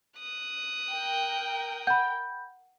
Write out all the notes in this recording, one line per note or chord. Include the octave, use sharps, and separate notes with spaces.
D#6 F#6
A#4 G5
F#5 B5 G6